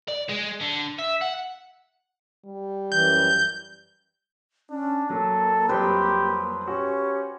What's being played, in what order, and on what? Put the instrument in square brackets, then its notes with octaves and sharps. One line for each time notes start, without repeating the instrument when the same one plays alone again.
[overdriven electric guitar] D5
G#3
D3
E5
F#5
[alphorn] G3
[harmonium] F#2 E3 [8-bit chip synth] G6
[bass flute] C#4 [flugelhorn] D4
[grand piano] F#3 [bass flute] A#3 [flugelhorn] A4
[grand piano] F2 F#3 G3 [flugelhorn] G4 [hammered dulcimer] B4 C5 G5
[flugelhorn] C#4 [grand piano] F#4 [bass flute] G4